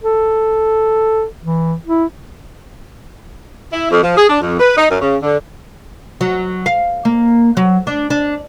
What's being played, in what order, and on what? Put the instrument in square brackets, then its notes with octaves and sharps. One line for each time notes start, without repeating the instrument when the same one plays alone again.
[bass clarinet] A4
E3
E4
[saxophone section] E4
F2
F3
G#4
D4
F2
B4
D#4
F#2
C#3
D3
[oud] F#3
F5
A#3
F#3
D4
D4